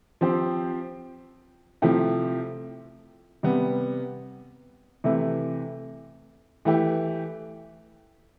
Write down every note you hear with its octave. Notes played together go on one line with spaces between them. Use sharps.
F3 C4 G4
C3 F3 A3 E4 G4
C3 G3 B3
C3 E3 A3 E4
E3 A3 E4 G4